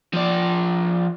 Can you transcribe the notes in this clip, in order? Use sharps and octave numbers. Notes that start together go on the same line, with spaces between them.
F3 D5